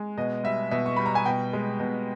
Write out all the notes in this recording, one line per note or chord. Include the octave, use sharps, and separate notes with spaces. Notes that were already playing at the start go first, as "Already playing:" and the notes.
Already playing: G#3
B2 D#5
G3 E5
B2 E5
C#6
G3 B5
A#5
G#5
B2 G5
G#3
B2